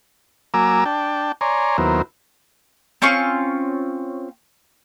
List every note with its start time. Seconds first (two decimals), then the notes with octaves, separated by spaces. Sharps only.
0.54 F#3 A#3 G#5 A#5 D6 E6
0.85 D4 G5 A5
1.41 C#5 D5 G#5 A#5 C6
1.78 D#2 F#3 B3 E4 A#4 C5
3.02 C4 C#4 F4 C#6